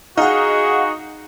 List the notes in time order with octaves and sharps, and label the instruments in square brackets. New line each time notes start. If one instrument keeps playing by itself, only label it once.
[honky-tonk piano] D#4 [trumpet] F#4 [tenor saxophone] G#4 [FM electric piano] F5 F#5